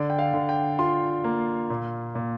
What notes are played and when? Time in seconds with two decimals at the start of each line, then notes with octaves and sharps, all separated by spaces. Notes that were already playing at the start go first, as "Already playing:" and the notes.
Already playing: D3 D5
0.10 G5
0.19 F5
0.33 D3
0.49 G5
0.79 F4 C6
1.24 A#3
1.70 A#2
2.15 A#2